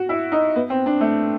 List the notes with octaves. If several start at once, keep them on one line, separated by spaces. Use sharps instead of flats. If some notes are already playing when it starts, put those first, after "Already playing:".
Already playing: F#4
E4
D#4
B3
C4
D4
A3